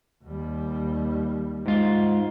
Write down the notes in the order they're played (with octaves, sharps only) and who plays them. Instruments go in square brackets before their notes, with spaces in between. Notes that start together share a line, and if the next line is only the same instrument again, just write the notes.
[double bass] D#2 G3
[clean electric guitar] G#2 F4